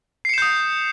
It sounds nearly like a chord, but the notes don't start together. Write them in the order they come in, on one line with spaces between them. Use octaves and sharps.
C7 C#7 E7 G6 D#6